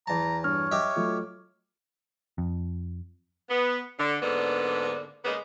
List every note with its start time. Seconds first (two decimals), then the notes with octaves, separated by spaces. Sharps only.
0.07 E2 A5 A#5
0.44 G2 C#5 F6
0.71 G4 D#5 E5
0.96 F#3 A3 F4
2.38 F2
3.49 B3
3.99 D3
4.22 G#2 D3 A#3 B3 D4
5.25 C#3 G#3 A#3 B3